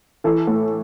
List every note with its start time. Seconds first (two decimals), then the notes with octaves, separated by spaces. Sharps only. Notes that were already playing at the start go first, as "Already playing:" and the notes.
0.24 E3 A4
0.47 A2